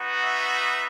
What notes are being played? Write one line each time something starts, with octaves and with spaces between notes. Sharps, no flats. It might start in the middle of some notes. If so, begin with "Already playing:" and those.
Already playing: B3 D#4 F#4
E5